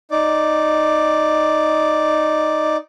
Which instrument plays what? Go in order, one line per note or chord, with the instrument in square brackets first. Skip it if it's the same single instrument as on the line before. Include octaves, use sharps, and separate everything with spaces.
[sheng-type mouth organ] D#4 D5